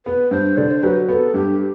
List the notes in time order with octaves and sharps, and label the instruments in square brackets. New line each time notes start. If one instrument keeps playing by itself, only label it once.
[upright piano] B3 [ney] B4
[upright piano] G2 [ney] C5
[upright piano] D3 [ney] D5
[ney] C5
[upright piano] F#3 [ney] B4
[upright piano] B3 [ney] B4
[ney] A4
[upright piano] G2 [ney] G4